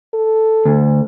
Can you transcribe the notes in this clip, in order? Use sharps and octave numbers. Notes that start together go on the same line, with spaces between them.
A4
D2